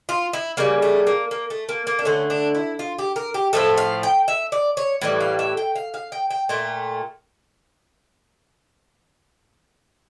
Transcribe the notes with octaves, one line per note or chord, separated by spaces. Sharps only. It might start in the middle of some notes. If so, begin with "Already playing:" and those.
F4
E4
C#3 G3 A#3
A3
A#3
A#3
A3
A#3
A#3
D4
D3 A3 C#4
D4
E4
F4
G4
A#4
G4
A2 F3 A3 A4
F5
G5
E5
D5
C#5
A2 E3 G3
F5
E5
G5
F5
F5
G5
G5
A#2 A3 G5